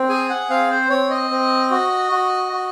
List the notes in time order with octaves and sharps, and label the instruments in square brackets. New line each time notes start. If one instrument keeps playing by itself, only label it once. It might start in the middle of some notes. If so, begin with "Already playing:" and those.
Already playing: [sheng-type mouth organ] C4
G#4 G#5
F#5
C4 F5
C5
C4 C#5
D#5
C4
F#4
F#4
F#4